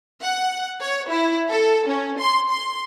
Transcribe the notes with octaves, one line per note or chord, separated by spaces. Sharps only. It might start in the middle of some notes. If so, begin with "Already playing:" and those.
F#5
C#5
E4
A4
C#4
C6
C6